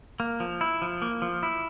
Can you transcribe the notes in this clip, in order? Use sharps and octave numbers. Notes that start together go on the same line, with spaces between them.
A#3
F3
E4
F3
A#3
F3
E4